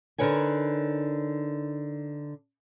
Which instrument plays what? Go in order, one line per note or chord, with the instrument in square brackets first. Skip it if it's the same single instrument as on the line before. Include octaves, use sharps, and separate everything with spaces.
[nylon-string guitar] D3 D#4 A#4 B4 C#5 G#5